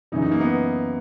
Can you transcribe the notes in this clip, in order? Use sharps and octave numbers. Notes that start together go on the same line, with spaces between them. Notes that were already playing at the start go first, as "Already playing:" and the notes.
F#2 C#3 E3 D#4
D#4
A#3
B3